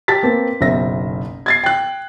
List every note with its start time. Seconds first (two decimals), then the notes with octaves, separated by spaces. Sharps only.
0.08 G4 A5 A6 B6
0.23 A#3 C4 B4
0.61 F#1 B1 C5 E5 A#6
1.46 G#6 A6 C7
1.63 G5 F#6